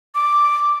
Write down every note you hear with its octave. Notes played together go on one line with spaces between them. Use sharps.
D6